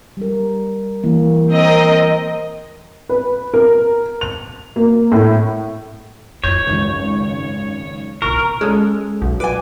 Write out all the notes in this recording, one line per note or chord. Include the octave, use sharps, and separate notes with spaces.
G3 A#4
E3 A#3
C4 A#4 D#5
B4
A#4
F7
A#3
A2
F#2 C#5 G6 G#6
G#1 C#2
B1 D3 A#4 C#6
G#3 C#4 A4
B1
B4 G#5 D6